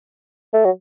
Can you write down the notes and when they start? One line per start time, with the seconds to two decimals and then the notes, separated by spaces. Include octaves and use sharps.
0.54 A3
0.65 F#3